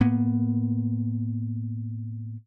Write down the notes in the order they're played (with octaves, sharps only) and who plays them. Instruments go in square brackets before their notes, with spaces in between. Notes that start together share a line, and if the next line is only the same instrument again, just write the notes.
[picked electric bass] A2 A#3 B3